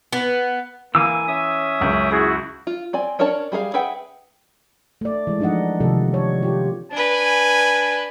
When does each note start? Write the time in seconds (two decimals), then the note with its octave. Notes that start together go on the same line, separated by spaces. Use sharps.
0.13 B3
0.95 E3 A#3 G#5 D6 E6
1.28 C#4 E5 D#6
1.81 C#2 F#2
2.11 E4 F#4 G#4
2.67 F4
2.93 C4 D5 G#5
3.19 C#4 D4 A#4 C#5 A5
3.52 G3 G#4 A#4 F5
3.74 G#4 B4 E5 F#5 G5
5.01 A3 D5
5.27 E3 G#3
5.40 F3 D4 D#4 D#5 F#5
5.80 C3 D#3 F3 A4
6.14 C#5
6.43 F4 G4
6.92 D4 B4 G#5